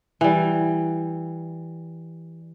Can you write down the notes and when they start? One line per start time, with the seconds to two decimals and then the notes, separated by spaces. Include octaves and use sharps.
0.21 E3 G3